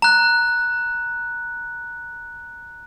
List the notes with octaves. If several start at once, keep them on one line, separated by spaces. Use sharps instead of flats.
A#5 F#6